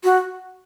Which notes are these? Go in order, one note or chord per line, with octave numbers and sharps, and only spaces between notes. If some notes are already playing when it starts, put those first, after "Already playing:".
F#4